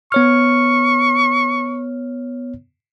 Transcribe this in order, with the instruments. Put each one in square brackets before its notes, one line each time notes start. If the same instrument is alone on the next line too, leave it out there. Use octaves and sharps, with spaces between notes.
[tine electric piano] B3 C#5 F6 [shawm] C#6